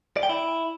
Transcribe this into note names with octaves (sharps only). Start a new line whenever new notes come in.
D5
G5
E4